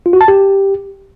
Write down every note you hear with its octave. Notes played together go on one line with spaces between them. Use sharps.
F4
F#4
A5
G4